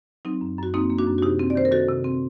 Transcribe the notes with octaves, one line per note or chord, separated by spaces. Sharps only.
F#3 C4 D#4
F#2
F#2 F#4
A#3 C4 D#4
A#3
D4 F#4
F#2
F#4
C3 D#4 G4
C4
D5
D#3 C5
A#4
D#3 F#4 A4
C3
C4